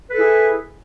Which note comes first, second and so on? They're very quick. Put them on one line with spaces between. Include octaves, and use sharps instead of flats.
B4 A4 E4 G#4